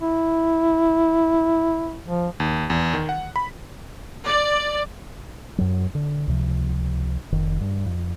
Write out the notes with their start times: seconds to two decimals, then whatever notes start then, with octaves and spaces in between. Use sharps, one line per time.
0.01 E4
2.06 F3
2.40 D#2
2.70 E2
2.93 D#3
3.09 F#5
3.36 B5
4.26 D5
5.58 F#2 F#3
5.95 D3
6.27 C#2 C3 F3
7.32 F1 D#3
7.61 G2
7.86 F2